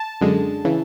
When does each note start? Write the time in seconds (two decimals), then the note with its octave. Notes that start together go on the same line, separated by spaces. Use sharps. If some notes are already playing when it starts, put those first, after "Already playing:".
Already playing: A5
0.21 F#2 D3 G#3
0.65 C#3 E3